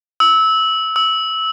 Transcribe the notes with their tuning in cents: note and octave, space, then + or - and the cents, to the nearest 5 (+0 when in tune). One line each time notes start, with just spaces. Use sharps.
E6 -20
E6 -20